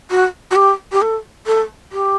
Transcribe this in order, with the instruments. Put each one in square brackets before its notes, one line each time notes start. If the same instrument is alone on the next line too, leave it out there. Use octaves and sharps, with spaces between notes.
[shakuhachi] F#4
F#4
G4
G4
A4
A4
G4